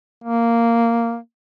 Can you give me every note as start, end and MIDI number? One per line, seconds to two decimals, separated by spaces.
0.24 1.17 58